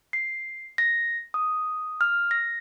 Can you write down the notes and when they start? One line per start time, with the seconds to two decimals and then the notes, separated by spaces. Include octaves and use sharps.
0.13 C7
0.78 A#6
1.34 D#6
2.01 F6
2.31 A#6